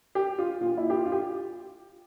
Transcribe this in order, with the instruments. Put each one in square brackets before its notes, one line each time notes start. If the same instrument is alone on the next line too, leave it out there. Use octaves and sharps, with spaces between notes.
[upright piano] G4
F4
A#2 F4
E4
G4
F4
F4
G4